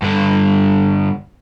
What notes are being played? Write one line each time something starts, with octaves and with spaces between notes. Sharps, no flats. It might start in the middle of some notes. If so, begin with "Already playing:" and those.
G2 D3